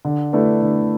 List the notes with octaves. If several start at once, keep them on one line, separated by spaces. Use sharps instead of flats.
D3
A3 E4 B4 D5
D3